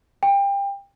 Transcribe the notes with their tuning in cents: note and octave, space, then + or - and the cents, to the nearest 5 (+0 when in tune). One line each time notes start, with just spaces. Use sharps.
G5 +25